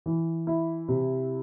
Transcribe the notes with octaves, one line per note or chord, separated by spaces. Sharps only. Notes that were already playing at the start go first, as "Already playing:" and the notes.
E3
E4
C3